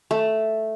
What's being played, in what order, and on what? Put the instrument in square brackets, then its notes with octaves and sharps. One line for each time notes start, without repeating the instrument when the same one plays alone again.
[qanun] A3